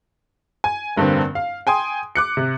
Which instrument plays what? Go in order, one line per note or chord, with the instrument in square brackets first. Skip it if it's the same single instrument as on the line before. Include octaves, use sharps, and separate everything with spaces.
[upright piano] G#5
F1 G2 D3 A#3 C4
F5
G5 G#5 C6 D#6
D6 F#6 C#7
C3